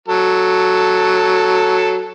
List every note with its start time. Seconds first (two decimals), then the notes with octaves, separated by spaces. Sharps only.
0.08 F#3 A4